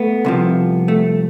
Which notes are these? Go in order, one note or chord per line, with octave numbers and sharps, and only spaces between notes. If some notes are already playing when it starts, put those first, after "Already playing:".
Already playing: A3 B3
C2 C3 F3
A3